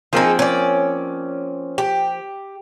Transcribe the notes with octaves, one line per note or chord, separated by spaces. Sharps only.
F3 A#3 C4 D#4 G#4
C#4 D5
G4